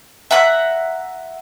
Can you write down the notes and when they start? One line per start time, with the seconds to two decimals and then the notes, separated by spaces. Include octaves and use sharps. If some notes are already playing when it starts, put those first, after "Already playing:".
0.31 E5 F#5 A#5 F#6